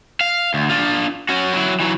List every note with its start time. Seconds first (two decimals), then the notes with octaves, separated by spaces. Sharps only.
0.21 F5
0.54 D2
0.70 D4 F4
1.29 C#4 F#4
1.54 F#3 E4
1.80 E3 F#3